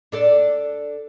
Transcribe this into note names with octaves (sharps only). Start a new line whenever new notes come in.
D4 A4 D5